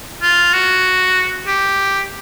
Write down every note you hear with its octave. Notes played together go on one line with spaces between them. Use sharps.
F4
F#4
G4